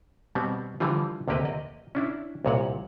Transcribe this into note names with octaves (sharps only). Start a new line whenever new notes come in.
B2 G3 B3 C4
D3 E3 F3 G3 F4
D2 C3 A#3 G4 B4 D#5
D#5
C#4 D4 E4
C2 A#2 C#5 F#5